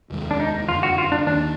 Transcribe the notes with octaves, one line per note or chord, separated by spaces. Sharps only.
F1 D#2 D#3 G#3
D4
D#4
F#1 F2 D3 F4
F#4
F4
D4
D#2 D#3 A#3 D4